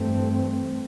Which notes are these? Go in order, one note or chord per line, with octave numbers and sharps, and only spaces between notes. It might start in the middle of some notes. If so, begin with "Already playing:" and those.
Already playing: G2 E3 A3 C4